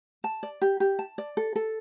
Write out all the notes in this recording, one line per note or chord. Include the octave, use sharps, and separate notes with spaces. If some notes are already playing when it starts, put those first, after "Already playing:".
A5
D5
G4
G4
A5
D5
A4
A4